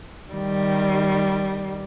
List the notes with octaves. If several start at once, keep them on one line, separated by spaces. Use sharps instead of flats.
D#3 G3